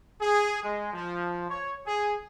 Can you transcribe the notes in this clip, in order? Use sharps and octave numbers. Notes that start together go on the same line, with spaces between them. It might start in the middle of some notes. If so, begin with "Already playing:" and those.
G#4
G#3
F3
C#5
G#4